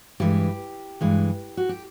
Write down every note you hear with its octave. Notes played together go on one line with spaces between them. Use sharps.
G2 E3 G#3 G4
G2 E3 G#3
F#4
G4